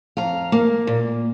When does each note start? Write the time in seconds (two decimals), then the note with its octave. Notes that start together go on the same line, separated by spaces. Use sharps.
0.17 F2 F5 A#5
0.52 A#3
0.87 A#2